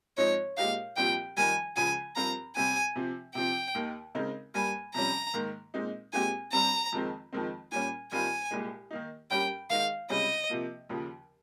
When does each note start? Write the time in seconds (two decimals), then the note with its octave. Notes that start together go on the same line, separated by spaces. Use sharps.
0.17 G#2 F3 C4 D#4 C#5
0.57 A#2 G#3 D#4 G4 A#4 F5
0.97 C2 A#2 F3 C4 G4 G5
1.37 F2 D#3 G3 G#5
1.76 C#2 C#3 F3 G#5
2.16 G2 F3 C4 F4 A#4 A#5
2.55 C3 G3 C4 G4 G#5
2.96 C3 F3 C4
3.35 C3 F3 C4 G5
3.75 D#2 D#3 A#3
4.15 C#3 G#3 C4 D#4 A#4
4.54 G2 G3 A#3 G#5
4.94 F2 C3 G3 C#4 A#5
5.34 G#2 D#3 A#3
5.74 A#2 G#3 C4 D#4
6.13 A#2 G#3 C4 G4 G#5
6.52 G2 G3 C4 A#5
6.92 F2 D#3 G#3 C4
7.32 F2 D#3 G#3 C4
7.72 A#2 G3 C#4 G#5
8.12 G2 D#3 G3 C4 F4 G#5
8.51 C2 A#2 G#3
8.91 D#3 A#3 D#4
9.30 G2 G3 C#4 G4 A#4 G5
9.70 D#3 G#3 D#4 F5
10.10 C#2 C3 G3 C#4 G#4 D#5
10.50 C3 F3 A#3
10.89 D#2 C#3 F3